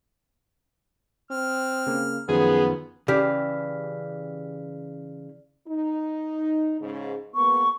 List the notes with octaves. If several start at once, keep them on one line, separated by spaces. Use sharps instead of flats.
C4 F6
C#3 A#3
F#2 D#3 F3 B3 G#4
C#3 E3 G4 D5 F6 B6
D#4
G#2 C#3
G#3 A#3 B3 C#6